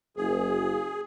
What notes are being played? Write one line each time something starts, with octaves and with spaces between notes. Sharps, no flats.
F#1 G#4